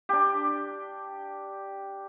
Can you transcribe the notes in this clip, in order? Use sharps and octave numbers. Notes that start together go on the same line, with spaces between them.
D4 G4